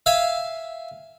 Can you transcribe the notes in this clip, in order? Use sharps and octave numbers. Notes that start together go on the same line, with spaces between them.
E5 F5 G#5